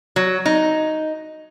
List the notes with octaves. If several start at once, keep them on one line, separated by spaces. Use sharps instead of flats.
F#3
D#4